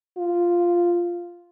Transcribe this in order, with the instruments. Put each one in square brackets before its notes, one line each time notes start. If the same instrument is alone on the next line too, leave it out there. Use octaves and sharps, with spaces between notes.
[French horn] F4